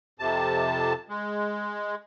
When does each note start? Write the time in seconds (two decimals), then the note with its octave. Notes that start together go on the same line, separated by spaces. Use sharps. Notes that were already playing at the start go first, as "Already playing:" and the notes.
0.19 F2 C3 A5
1.09 G#3